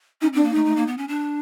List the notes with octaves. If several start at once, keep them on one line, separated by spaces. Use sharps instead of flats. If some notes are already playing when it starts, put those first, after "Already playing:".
C#4 D#4
C4
D4
A#3
A3 D#4
A3
A#3
B3
C#4
D4